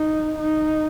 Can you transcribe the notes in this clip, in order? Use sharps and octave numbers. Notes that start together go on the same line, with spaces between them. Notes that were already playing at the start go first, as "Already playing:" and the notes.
Already playing: D#4
D#4